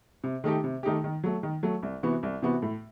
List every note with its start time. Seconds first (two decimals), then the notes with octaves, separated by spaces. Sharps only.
0.24 C3
0.44 D#3 A3 D#4 G4
0.64 C3
0.83 D#3 A3 D#4 G4
1.04 D#3
1.24 F#3 A3
1.43 D#3
1.63 F#3 A3
1.83 C2
2.03 C3 E3 B3 F#4
2.23 C2
2.42 C3 E3 B3 F#4
2.62 A2